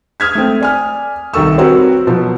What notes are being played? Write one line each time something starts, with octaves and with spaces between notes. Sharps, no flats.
D#6 F6 G#6 B6
A3 C4
D5 G#5 F6
C2 D#3 D#4 A4 C#6 E6
C4 F#4 A#4 B4 C#5
B2 F3 F#3